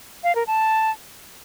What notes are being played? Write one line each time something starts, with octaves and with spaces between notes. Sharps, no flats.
F5
A#4
A5